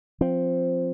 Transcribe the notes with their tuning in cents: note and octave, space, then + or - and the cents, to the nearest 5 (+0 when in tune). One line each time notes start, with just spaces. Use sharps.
F3 +0 C4 +0